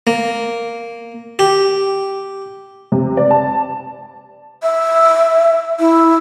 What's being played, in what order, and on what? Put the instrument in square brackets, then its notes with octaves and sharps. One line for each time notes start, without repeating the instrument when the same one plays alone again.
[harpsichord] A#3
G4
[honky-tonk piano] C3
D5
A5
[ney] E5
E4